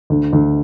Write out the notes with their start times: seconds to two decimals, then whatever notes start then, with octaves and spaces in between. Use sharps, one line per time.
0.10 D2
0.33 D2